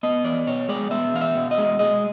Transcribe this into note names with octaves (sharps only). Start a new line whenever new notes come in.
B3 D#5
E2 D5
B2 C#5
G#3 D5
B3 E5
E2 F5
E5
B2
D#5
G#3
G#3 D#5